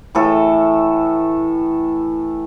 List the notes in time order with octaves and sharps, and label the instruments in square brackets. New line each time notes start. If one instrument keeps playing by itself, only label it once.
[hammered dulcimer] A2 E3 A4